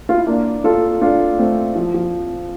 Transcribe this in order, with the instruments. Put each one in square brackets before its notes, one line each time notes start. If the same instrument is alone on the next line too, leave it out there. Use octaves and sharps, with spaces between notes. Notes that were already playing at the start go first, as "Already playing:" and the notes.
[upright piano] F4
E4
A#3 D4
F4 A4
D4 F4
A3 C4
F3
F3